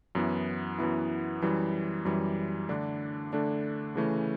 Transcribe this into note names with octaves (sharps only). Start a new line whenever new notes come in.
F#2 E3 B3 E4
F#2 E3 B3 E4
F#2 E3 G3
F#2 E3 G3
D3 A3 D4
D3 A3 D4
C#3 E3 A3 C#4